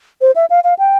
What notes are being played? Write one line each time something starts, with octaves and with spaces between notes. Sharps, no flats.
C5
E5
F5
F5
G5